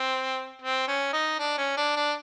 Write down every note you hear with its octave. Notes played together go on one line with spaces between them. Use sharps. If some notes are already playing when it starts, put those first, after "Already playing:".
Already playing: C4
C4
C#4
D#4
D4
C#4
D4
D4